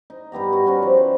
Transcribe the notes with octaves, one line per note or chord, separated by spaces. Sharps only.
D#4
G2 B3 G4 A#5
F#4
G3 C#4 F#4
F3
C5 B5